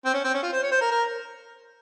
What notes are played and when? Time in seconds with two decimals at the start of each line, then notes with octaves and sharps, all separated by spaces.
0.05 C4
0.14 C#4
0.24 C4
0.34 C#4
0.42 F4
0.53 C5
0.63 C#5
0.71 C5
0.81 A#4
0.91 A#4